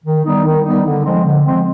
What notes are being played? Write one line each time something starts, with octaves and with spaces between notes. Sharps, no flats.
D#3
G3 B3 D#4
D#3
G3 B3 D#4
D3
F3 G#3 C4
D3
F3 G#3 C4